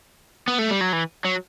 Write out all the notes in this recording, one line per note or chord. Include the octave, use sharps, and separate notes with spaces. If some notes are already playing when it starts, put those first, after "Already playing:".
B3
A3
G3
F#3
E3
F#3